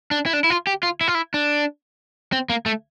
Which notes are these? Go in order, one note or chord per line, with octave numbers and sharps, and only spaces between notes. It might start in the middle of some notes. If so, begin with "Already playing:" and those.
D4
E4
D4
E4
F4
G4
F4
E4
F4
E4
D4
C4
A#3
A3